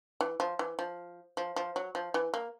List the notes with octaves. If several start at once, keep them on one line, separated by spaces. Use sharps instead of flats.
E3
F3
E3
F3
F3
F3
F#3
F3
E3
A#3